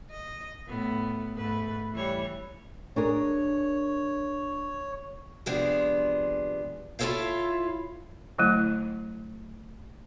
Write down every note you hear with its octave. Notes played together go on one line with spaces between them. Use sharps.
D#5
A2 B3
G#2 A3 B4
E3 G3 C#5
D4 G#4 A#4 C#5
C3 F3 G#3 B3 D4
E4 F4 G4 A4 C#5 F5
D3 F#3 A3 E4